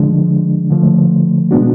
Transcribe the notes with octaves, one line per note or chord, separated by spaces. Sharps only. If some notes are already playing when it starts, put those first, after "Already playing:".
Already playing: D3 F3 G#3 D4
D3 F3 A3
B2 G#3 B3 D4 F#4